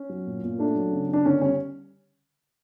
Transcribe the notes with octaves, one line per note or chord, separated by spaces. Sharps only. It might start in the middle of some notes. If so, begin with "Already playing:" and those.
Already playing: C#4
F#3
A#2
A#2
A3 D4
F#3
C#3
C#3 D4
D3 C#4
G3 C#4